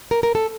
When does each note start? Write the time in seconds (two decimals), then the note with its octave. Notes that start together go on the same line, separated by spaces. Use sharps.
0.11 A#4
0.23 A#4
0.35 A4